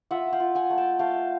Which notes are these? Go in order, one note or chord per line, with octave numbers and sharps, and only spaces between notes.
F4 E5 F#5
F5 G5
F4
F#5 G#5
A3
G5 A5
A3 F5 G5